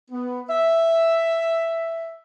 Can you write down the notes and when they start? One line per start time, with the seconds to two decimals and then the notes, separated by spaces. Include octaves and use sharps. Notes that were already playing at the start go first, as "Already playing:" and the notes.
0.11 B3
0.49 E5